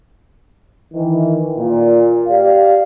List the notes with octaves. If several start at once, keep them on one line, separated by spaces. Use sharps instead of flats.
D#3 E3
A#2
G4 D5 F5